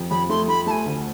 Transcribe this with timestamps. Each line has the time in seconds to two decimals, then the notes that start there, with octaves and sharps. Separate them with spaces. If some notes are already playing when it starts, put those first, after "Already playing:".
Already playing: F2
0.10 F2 B5
0.29 A3 C6
0.48 A3 B5
0.66 A3 A5
0.71 G#5
0.86 D2